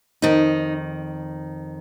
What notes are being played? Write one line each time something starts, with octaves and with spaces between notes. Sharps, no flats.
F2 D#3 D#4